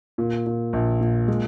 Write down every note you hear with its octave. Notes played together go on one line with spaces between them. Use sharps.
A#2
A#2
A#1
A#2
G#3